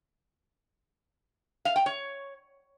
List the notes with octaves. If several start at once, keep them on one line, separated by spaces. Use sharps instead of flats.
F5
G5
C#5